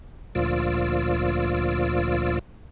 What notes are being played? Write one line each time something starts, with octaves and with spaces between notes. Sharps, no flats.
D2 A#2 F3 F4 D5 E6